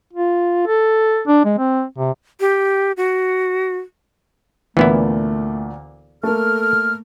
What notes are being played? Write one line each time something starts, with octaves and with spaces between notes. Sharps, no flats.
F4
A4
D4
G#3
C4
C3
G4
F#4
D2 A#2 E3 A3 B3 E4
A3 A#3 A4 F6